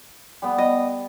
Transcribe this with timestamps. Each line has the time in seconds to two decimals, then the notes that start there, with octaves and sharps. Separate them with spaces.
0.42 G3 B3
0.58 D#5